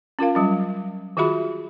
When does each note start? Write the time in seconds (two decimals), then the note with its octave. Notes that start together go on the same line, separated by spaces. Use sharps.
0.19 C#4 F4 A#4 F5
0.35 F#3 G3 C#4
1.17 D#3 F4 F#4 G#4 E5 B5